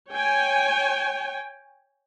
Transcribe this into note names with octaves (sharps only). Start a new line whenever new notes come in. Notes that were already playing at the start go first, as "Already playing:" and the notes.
C#5 G5 G#5